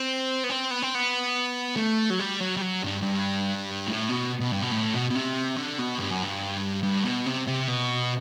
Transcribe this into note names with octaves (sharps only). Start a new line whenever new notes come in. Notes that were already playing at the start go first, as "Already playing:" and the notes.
Already playing: C4
B3
C4
B3
C4
B3
A3
F#3
G3
F#3
G3
F#3
G2
G2
A2
B2
B2
G2
B2
A2
B2
B2
C3
D3
B2
G2
F#2
G2
G2
B2
C3
C3
B2